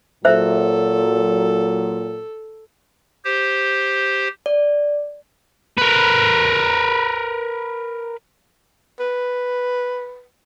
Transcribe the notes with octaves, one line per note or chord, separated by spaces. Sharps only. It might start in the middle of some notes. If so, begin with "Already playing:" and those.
A#2 F#3 A4 C5 E5
G4 C5
D5
A#4 B4
B4